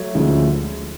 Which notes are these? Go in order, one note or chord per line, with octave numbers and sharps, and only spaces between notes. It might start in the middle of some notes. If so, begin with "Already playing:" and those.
Already playing: F#3 A3
D2 D3 F3 G#3 C#4